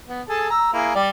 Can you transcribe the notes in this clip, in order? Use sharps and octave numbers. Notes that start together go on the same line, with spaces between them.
B3
G#4 A4 A5
A#5 E6
A#3 E4 G#4
G3 D5